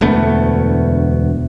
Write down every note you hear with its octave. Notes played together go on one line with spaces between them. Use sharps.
E1 D2 A3 B3